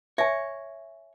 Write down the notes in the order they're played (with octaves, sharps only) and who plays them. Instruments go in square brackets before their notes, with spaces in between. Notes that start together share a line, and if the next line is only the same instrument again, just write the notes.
[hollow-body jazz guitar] C#5 [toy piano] E5 G#5